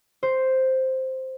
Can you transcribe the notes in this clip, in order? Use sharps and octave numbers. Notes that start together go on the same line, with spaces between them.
C5